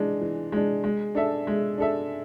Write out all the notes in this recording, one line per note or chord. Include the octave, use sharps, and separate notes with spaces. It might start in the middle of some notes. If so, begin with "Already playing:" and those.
Already playing: E3 G#3 D4
E3
G#3 D4
G#3
D4 A4 E5
G#3
D4 A4 E5